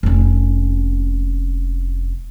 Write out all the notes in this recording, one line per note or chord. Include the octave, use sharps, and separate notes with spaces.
F1 C#4